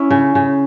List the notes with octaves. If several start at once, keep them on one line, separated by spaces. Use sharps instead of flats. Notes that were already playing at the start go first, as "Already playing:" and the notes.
Already playing: C#4 E4
C#3
C#3